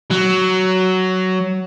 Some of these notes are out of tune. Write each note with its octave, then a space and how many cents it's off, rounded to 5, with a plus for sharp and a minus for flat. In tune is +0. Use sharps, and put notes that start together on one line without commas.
F#3 +10